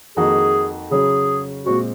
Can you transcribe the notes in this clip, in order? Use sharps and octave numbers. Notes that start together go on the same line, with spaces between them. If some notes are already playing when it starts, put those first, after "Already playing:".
F2 D#3 A#3 D#4 F#4 G#4
C#3 F#3 C#4 G#4
A#2 G#3 C4 F#4